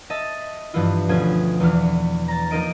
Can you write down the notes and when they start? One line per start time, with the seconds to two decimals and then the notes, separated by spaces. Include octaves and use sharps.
0.10 D#5 E5 A5 A6
0.73 G2 E3 F3 B3 E4 F4
1.09 D2 B2 F3 C#4 F4 G#6
1.60 E2 E3 D4 F6
2.28 A#5 A6
2.51 F3 A#3 D#4 A#4 D#5 D7